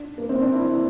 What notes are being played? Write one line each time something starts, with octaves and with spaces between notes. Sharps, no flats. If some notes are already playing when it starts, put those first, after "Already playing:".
Already playing: D4
A#3
C4
D4
E4